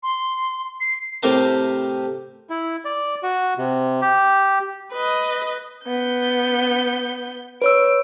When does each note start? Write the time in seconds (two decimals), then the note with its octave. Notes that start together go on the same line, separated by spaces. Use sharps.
0.03 C6
0.80 C7
1.23 A2 C3 G4 A#4 A5
2.50 E4
2.85 D5
3.23 F#4
3.58 C3
4.02 G4
4.92 B4 D#5
5.86 B3 G6
7.62 B4 C#5 E6 D7